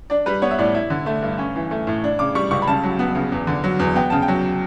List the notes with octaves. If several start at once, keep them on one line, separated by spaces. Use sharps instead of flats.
D4 D5
G3 B4
B3 C#5
E5
A2 D5
E4
D3
A3
G2
C#4
E3
A3
A2
D4
C#3 D6
G3 C#6
C#2 C#6
B5
C#3 A5
F#3
B3
C#3
E2
D3
F#3
E2
B3 G5
C#3 A5
G5
F#3